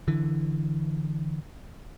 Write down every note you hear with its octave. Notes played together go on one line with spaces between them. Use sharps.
D3 E3